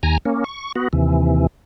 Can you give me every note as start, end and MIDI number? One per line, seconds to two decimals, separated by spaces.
0.03 0.18 39
0.03 0.18 80
0.03 0.18 82
0.25 0.44 58
0.25 0.44 61
0.44 0.72 85
0.76 0.88 59
0.76 0.88 66
0.93 1.47 39
0.93 1.47 48
0.93 1.47 52